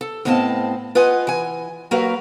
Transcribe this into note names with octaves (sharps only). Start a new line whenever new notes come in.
A4
A2 B3 C4 D#5 F5 A5
F4 B4 D#5 F#5 G#5
E3 G#5
F#3 A#3 F#4 A#4 B4 F5